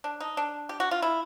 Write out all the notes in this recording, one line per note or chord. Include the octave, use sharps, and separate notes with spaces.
D4
D#4
D4
G4
F#4
F4
E4